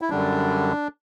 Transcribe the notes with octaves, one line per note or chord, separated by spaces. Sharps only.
E4
F#2 D3 G3 D4